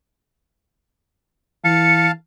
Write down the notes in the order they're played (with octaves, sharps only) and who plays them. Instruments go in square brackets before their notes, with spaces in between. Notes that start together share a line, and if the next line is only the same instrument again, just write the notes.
[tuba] E3 [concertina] F5 A5 [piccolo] C#7